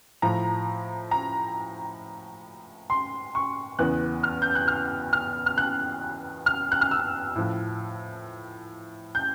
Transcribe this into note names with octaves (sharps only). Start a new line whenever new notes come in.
A2 F3 A#5
A#5
C6
C#6
E2 C#3 E3 F#6
F6
G6
F#6
F6
F6
F6
F#6
F6
F#6
F6
E6
A2 F3
G6